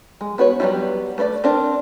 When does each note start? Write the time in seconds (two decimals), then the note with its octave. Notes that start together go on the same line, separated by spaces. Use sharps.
0.21 G#3
0.38 B3 F#4 B4 C#5
0.60 F#3 G3 B3 C4 E4
1.18 A3 B4 C5 D5
1.44 C4 D4 A#4